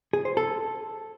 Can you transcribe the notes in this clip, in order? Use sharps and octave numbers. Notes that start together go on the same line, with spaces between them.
G#4
C5
A4